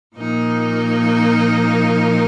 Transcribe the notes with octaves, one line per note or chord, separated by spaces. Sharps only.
A#2 F3 A#3 D#4 A#4